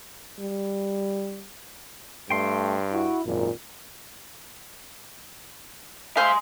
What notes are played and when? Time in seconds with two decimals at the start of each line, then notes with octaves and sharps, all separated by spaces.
0.40 G3
2.30 G2 A3 G5 C6
2.93 E4 F#4
3.26 G#1 F#2 A#2
6.17 C5 E5 F5 G#5 C6